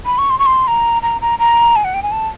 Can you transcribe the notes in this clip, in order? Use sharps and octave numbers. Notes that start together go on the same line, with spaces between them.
B5
C#6
C6
C#6
C6
A#5
A#5
A#5
A#5
G#5
F#5
G5
G#5
A5